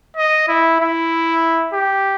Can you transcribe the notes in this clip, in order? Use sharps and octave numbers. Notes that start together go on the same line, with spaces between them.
D#5
E4
E4
G4